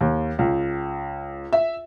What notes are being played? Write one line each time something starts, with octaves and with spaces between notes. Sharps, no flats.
D#2
C#2
E5